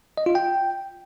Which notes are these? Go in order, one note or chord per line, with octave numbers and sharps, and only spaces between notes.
D#5
F4
G5